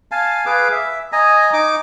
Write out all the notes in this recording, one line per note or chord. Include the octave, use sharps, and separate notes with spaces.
F5 G#5 A5
G#4 B4 F5 D6
E5
D#5 G#5 A#5
D#4 D6